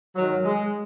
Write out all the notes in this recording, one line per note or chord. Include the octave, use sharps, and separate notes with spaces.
G#2 D#3 F#3
G#3